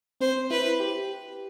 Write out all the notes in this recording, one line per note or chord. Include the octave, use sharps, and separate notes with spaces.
C4 C5
E4 B4
G4